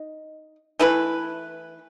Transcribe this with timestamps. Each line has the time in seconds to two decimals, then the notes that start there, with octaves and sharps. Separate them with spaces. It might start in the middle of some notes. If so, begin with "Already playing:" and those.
Already playing: D#4
0.79 E3 A3 E4 B4